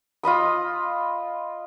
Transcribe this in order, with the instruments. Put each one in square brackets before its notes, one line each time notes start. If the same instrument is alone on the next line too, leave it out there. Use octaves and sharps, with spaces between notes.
[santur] F4 D#5 B5 D#6